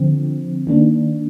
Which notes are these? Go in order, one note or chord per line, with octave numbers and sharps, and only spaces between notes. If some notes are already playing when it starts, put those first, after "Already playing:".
Already playing: D3 F3 C4
D#3 A#3 D4